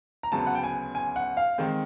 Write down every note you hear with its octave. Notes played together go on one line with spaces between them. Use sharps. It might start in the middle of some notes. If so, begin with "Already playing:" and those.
A#5
D2 C#3 F#3 B3 A5
F#5
G5
G#5
G#5
F#5
F5
D#3 G#3 C4